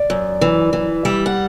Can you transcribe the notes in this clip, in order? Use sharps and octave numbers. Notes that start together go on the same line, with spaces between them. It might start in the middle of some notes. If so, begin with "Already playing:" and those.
Already playing: D5
F#2
E3
E3
G3 E5
F#5